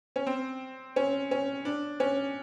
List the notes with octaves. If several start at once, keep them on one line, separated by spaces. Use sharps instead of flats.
C#4
C4
C#4
C#4
D4
C#4